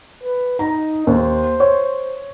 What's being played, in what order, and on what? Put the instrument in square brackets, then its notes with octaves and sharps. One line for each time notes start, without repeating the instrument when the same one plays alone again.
[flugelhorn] B4
[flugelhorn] D#4 [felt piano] A#5
[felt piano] D#2 [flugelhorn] C5
[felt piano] C#5